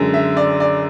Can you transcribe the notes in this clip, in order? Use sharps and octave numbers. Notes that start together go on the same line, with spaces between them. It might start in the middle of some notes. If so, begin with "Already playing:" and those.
Already playing: F#2 D3 G#3
E5
D5
D5